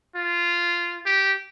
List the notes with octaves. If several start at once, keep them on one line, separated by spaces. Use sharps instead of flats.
F4
G4